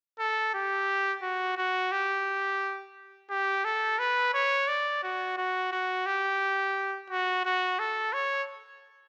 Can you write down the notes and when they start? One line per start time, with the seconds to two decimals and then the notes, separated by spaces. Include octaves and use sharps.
0.19 A4
0.54 G4
1.22 F#4
1.57 F#4
1.92 G4
3.30 G4
3.65 A4
3.99 B4
4.34 C#5
4.68 D5
5.03 F#4
5.37 F#4
5.72 F#4
6.06 G4
7.10 F#4
7.45 F#4
7.79 A4
8.13 C#5